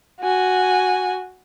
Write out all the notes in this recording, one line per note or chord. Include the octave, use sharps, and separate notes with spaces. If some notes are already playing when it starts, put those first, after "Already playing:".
F#4 G#5